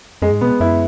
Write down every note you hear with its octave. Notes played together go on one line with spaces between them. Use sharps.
F#2 G#3
G#2
B2 B3
F#2 E4